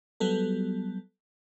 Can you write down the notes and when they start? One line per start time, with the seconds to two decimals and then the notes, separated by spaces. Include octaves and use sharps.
0.20 F#3 G3 B3 A4